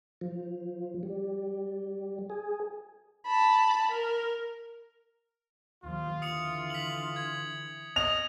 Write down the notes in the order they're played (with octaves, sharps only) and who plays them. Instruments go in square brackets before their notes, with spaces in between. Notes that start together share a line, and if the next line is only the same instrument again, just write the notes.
[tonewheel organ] F3
G3
G#4
[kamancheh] A5 B5
A#4
[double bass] D#2 F3 [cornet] F4
[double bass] D3 E3 [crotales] D#6 C#7 F7
[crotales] B6 F7 F#7
G#6
[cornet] D#5 [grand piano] F7